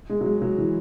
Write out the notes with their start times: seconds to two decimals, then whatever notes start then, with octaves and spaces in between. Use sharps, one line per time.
0.09 G#3
0.21 F#3
0.26 G#3
0.42 F#3
0.58 E3